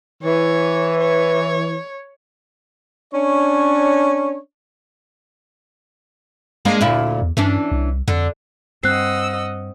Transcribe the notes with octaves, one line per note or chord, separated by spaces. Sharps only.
E3 C#5
C#5
C#4 D4 C#5
G#3 A#3 D4
D2 A#2 E4
E2
G2 E3 C#4 D4
C2
F2 D3
G2 C4 D#5 F#5 E6 F#6 C7